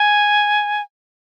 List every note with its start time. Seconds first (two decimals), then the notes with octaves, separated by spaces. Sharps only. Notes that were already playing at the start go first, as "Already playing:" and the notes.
Already playing: G#5